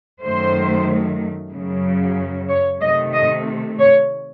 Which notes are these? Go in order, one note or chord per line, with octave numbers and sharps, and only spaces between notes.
F#2 D#3 F#3 A3 C5
F#2 C#3 F#3
C#5
C3 D#3 A3 D#5
D#5
C#5